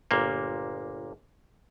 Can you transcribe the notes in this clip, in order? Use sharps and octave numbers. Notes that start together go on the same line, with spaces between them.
G1 A#2 A#3